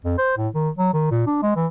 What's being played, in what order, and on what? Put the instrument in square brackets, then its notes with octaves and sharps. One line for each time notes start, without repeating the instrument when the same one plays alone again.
[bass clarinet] F2
C5
A2
D#3
F#3
D#3
A#2
D4
G#3
E3